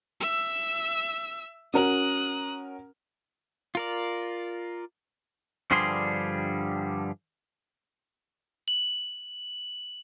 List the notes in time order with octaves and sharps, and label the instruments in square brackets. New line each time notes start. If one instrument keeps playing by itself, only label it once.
[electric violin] E5 E6
[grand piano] C#4 F#4 A#4 [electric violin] D#6 F#6
[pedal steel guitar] F4 A#4 D5
[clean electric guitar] G2 D3 F3 G3 G#4 C6
[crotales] F#7